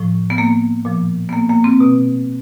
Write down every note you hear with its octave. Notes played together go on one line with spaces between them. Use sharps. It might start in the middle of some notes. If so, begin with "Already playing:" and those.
Already playing: A2 F3
B3
A#3
A#2 F3
B3
A#3
A#3
C4
B2